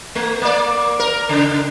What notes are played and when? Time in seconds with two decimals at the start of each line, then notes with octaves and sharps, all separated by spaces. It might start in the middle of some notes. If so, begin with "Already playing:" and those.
0.15 A3
0.42 A#3 D5
0.99 A#4
1.29 C#3